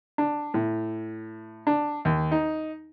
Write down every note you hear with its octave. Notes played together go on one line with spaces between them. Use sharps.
D4
A2
D4
D#2
D#4